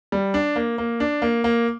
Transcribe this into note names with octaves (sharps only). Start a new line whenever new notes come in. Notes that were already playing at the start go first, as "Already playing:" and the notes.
G3
D4
A#3
A#3
D4
A#3
A#3